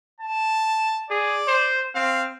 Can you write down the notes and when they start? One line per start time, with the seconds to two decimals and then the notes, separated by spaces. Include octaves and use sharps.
0.20 A5
1.10 G#4 D5
1.48 C5
1.96 C4 F5